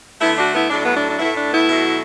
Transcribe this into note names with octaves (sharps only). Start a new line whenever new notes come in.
D3 A3 B3 E4
D4 F#4
B3 E4
A2 F#3 A3 D4
B3
D4
D4
A2 A3 B3 E4
D4
B3 E4
B2 F#3 A3